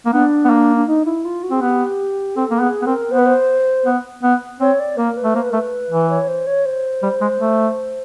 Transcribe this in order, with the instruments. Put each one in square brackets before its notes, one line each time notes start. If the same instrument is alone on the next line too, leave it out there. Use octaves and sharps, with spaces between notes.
[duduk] A#3
[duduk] B3 [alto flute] D4
[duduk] B3
A#3
[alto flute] D4
D#4
E4
F4
F#4
[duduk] C4 [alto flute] G#4
[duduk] B3 [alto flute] G4
[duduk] C4 [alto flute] A4
[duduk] A#3
[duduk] B3 [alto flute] G#4
[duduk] B3
[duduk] C4 [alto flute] A#4
[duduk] B3 [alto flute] C5
[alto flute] B4
C5
[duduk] B3
B3
[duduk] C4 [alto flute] C#5
[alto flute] D5
[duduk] A#3 [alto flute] A#4
[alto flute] B4
[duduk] A3
[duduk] A#3 [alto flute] C5
[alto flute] B4
A#4
[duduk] A3
[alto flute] B4
[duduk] E3
[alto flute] C#5
C5
C#5
C5
[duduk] G3
G#3
A3